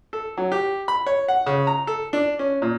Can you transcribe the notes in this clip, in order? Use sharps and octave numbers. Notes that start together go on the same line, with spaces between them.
A4
F#3
G4
B5
C#5
F#5
C#3
A#5
A4
D4
C#4
A#2